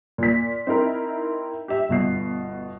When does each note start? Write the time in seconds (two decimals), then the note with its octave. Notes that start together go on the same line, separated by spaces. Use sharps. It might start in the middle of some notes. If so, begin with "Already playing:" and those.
0.18 A#2 B6
0.67 C4 D#4 E4 A#4
1.68 G4 E5
1.89 G1 B2 C7